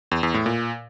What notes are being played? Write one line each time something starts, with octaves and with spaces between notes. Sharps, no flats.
E2
E2
A2
A#2